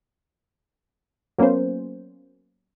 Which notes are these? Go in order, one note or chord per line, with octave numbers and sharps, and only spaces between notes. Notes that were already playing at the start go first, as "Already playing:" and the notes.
F#3 A#3 B3 C#4 C5